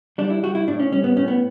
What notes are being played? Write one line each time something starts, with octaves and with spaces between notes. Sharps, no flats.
G3 D4
E4
G3 F#4
E4
A2 D4
C#4
G3 C#4
B3
A2 C#4
B3